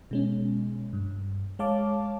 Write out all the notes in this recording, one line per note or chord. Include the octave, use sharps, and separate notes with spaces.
B2 G#3 C#4
G2
G#3 C#5 F5 A5 D6